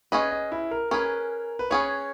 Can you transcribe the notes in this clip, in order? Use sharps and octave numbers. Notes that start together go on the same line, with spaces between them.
C#4 G#4 B4 D#5
D#5
E4
A#4
C#4 G#4 A#4 B4
B4
C#4 G#4 B4 C#5